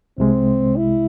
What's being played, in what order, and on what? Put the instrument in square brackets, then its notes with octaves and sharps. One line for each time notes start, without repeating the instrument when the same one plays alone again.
[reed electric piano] C2 C3 G#3 [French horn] C4
[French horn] E4